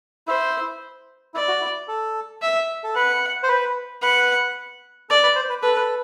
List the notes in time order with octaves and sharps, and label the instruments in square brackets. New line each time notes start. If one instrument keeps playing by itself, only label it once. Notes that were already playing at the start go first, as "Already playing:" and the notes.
[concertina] E4 [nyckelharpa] C5
[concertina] E4 [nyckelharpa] D5
[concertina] F#4
E4
A4
[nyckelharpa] E5
[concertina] A4
[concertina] B4 [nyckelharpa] F#5
[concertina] C5
B4
[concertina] B4 [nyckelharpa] F#5
[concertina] A4 [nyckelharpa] D5
[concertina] B4
C5
B4
[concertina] A4 [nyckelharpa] B4